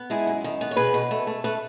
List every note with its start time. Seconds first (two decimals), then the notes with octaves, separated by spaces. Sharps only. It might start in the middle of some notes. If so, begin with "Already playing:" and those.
Already playing: B3
0.10 G#3 E4 G#4
0.27 F#2
0.44 D#3
0.61 B3
0.71 C#5
0.76 B2 G#4 B4
0.94 B2
1.11 A3
1.27 A3
1.44 A3 B4